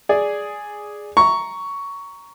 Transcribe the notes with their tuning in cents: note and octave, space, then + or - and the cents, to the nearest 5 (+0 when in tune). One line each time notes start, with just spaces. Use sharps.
G#4 +0 D5 +0
A#5 +0 C#6 +10